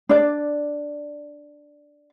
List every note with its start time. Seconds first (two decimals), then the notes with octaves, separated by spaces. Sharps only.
0.09 D4 D5